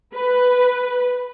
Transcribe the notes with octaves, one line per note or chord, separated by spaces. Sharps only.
B4